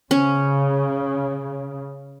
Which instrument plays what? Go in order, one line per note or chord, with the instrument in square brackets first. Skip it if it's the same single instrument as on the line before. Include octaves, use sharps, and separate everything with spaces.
[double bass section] C#3 [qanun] C#4